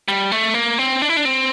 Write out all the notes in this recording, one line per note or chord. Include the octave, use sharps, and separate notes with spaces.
G3
A3
A#3
C4
D4
E4
D4
C4